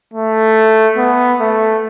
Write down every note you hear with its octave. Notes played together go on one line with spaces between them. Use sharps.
A3
B3
A3